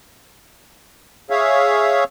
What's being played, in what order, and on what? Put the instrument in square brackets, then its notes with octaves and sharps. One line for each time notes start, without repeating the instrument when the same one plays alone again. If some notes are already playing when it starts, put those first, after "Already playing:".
[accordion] G#4 C#5 E5 F5